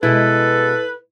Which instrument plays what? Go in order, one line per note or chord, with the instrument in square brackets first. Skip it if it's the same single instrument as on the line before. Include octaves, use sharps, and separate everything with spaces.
[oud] B2 G#3 [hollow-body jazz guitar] E4 [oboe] A4 [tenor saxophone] B4